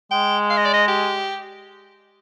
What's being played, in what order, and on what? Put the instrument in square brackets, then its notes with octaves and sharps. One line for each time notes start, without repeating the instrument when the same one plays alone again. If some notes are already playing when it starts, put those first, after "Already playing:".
[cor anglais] G#3 [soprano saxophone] G5
[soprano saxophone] F5
D#5
D5
D#5
G4